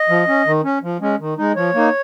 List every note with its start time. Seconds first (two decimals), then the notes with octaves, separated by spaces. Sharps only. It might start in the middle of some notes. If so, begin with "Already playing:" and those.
Already playing: D#5
0.09 F3
0.28 C#4
0.46 D#3
0.64 C#4
0.83 F3
1.01 G#3 C#4
1.19 D#3
1.38 G#3 D#4
1.56 F3 C#5
1.74 A#3 D#4